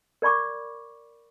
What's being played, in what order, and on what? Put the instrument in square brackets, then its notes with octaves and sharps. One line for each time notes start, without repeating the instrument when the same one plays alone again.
[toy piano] A#4 D5 B5 C#6 D6